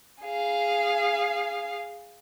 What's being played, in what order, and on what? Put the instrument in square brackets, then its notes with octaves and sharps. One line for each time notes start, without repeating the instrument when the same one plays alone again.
[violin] G#4 F5